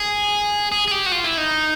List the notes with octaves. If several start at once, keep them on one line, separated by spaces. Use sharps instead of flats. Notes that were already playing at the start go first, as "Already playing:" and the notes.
Already playing: G#4
G#4
G#4
G4
F#4
F4
E4
D#4